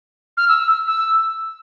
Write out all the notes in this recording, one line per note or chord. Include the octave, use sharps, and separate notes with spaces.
F6
E6
E6
E6